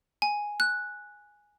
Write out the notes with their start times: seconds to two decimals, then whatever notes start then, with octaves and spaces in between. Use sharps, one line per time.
0.22 G#5
0.60 F#6